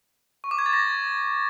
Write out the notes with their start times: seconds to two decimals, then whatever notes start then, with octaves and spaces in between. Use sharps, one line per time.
0.44 C#6
0.51 D6
0.59 G#6
0.66 A6
0.73 A#6